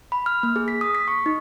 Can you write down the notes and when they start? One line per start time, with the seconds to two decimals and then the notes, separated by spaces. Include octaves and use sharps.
0.12 B5
0.26 F6
0.43 A#3
0.56 G#4
0.68 B6
0.81 D#6
0.95 B6
1.08 C#6
1.26 D#4